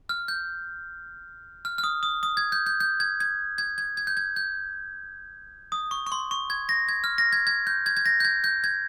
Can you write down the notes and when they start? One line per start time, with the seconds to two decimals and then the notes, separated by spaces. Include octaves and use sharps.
0.09 F6
0.28 G6
1.65 F6
1.78 F6
1.84 D#6
2.03 D#6
2.23 D#6
2.37 G#6
2.52 G6
2.66 G6
2.80 G6
3.00 G#6
3.20 G#6
3.58 G#6
3.78 G#6
3.97 G#6
4.07 G6
4.17 G#6
4.36 G6
5.72 D#6
5.91 C#6
6.06 C#6
6.12 C6
6.31 C#6
6.50 G#6
6.69 A#6
6.89 G#6
7.04 F6
7.18 A#6
7.33 G#6
7.47 G#6
7.67 G6
7.86 G#6
7.97 G#6
8.06 A#6
8.20 G6
8.25 G#6
8.44 G6
8.64 G#6